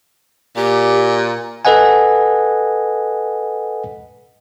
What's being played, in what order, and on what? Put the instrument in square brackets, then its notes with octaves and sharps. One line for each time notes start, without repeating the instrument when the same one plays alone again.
[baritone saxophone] A#2 [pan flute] G4
[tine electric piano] A4 B4 D#5 F#5 G#5